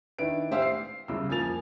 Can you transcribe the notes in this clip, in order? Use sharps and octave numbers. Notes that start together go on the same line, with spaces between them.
D#3 D4 E4 B4 D7
A2 G4 C5 E5 F5 E6
C7
C2 C#3 E6
F2 F3 A#3 G#5 A6 F7